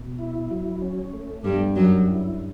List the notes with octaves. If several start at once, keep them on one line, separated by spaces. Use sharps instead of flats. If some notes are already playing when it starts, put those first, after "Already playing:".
Already playing: B2
E4
F#3
C#4
A3
G2 G3 B3
F#2 F#3 G4
E4